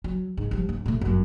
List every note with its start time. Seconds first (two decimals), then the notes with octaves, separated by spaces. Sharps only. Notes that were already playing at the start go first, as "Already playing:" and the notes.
0.04 F#3
0.37 G#2
0.51 F3 G3
0.69 D1
0.86 B2 A3
1.01 G1 F#2